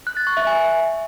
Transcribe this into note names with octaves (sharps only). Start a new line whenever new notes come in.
F#6
A6
C#6
E5
G#5